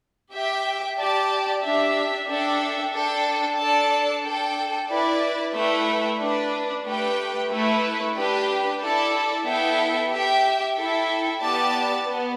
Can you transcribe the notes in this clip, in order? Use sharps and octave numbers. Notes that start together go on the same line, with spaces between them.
G4 E5 G5
G4 D5 A5
D4 G4 E5
D4 A4 E5 G5
D4 A4 G5
D4 A4 D5 A5
D4 A4 G5
E4 B4 D5
A3 E4 B4 E5 G5
D4 B4 D5
A3 G4 B4 G5
A3 E4 B4
D4 G4 B4 G5
E4 A4 D5 A5
B3 E4 A4 E5 G5
G4 E5 G5
E4 A4 E5 G5
B3 G4 D5 A5
B3